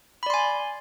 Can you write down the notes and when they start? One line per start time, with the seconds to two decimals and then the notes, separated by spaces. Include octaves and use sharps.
0.23 B5
0.26 D5
0.30 C6
0.34 G#5